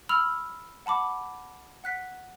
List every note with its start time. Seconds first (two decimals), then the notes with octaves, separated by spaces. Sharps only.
0.09 B5 E6 F6 F7
0.86 F#5 A5 B5 D6
1.84 F#5 F#6 B6